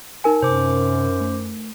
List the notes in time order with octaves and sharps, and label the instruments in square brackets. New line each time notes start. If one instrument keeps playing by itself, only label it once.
[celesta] D#4 A#4 G#5
[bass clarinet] F#2 [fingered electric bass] C3 [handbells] C5 D6
[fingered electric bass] A3